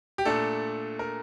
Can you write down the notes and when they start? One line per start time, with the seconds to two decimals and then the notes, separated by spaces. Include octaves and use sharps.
0.18 G4
0.25 A#2 A3 D4 A4
0.99 A#4